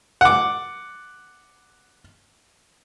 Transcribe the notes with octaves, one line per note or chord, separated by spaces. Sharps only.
F#5 D6